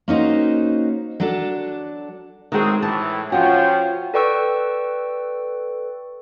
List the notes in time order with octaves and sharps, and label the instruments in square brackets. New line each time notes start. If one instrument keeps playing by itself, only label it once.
[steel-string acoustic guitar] A#3 C#4 D#4 F#4 C5
F#3 D4 A4
[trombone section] A2 C4 F#4 [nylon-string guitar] D#3 G#3 G#4
[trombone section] A2 E3 [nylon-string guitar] A5
[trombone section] F3 C#4 [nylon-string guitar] F4 F#4 [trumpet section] G5
[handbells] A4 B4 D5 G5 C#6 E6